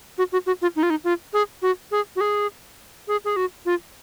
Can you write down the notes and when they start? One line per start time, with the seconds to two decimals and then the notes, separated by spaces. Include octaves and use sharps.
0.18 F#4
0.32 F#4
0.46 F#4
0.62 F4
0.76 D#4
0.83 F4
0.90 D#4
1.04 F4
1.33 G#4
1.62 F#4
1.91 G#4
2.16 F#4
2.21 G#4
3.08 G#4
3.25 G#4
3.36 F#4
3.66 F4